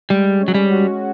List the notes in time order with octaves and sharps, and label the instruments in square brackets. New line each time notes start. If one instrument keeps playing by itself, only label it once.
[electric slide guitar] G3 [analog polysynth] G#3
[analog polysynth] C#4
[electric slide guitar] F#3
G3
[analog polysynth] F#4